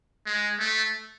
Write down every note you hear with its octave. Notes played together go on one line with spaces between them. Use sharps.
G#3
A3